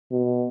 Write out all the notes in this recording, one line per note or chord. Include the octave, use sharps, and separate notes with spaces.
B2